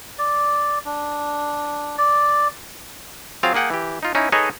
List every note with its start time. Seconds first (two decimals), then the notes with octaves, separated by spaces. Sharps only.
0.19 D5
0.85 D4
1.98 D5
3.43 F#3 C4 F4 G#4 F5
3.54 A#3 G#4 F#5 G5
3.70 E3 G4
4.03 D#4 F4
4.15 C#4 D#4 E4
4.32 D#4 G#4 A4 B4 C#5 D#5